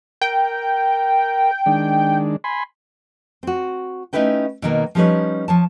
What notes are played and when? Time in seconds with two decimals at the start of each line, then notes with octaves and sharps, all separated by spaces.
0.22 A#4 G5
1.66 D#3 G#3 D4
2.44 G#5 B5 C6
3.43 C4 F#4
4.13 A3 C#4 D#4 E4 B4 G5
4.62 B2 D#3 A#3
4.95 F3 G3 C#4 D#4 B4 C#5
5.48 F3 C#5 A5